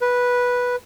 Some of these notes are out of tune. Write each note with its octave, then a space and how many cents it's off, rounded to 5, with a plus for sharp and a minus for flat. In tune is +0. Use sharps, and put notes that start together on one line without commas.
B4 -10